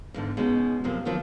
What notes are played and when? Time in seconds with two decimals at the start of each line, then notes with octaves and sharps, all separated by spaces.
0.14 E2 G#2 D3
0.37 B2 G#3 C#4 D#4
0.84 F#2 C3 F3 A#3
1.05 D#3 F3 F#3 A#3